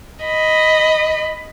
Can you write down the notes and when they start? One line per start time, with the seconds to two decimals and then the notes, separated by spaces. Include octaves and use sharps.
0.24 D#5 B5